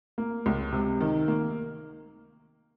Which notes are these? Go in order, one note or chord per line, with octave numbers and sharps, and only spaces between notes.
A#3
C#2
C3
D#3
A#3